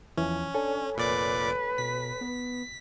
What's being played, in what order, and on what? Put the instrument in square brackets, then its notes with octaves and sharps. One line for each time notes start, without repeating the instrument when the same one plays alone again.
[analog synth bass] E2 [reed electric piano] E3 F3 [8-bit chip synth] C#4
[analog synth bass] D4 [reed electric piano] A4 C#5 G#5
[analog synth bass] F1 [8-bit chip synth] A#2 D5 D6 [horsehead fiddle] B4
[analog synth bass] B2 [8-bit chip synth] B6
[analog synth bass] B3